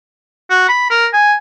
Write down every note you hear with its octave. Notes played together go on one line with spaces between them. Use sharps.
F#4
B5
A#4
G#5